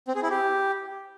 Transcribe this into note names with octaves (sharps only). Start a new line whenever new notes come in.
C4
G#4
E4
G4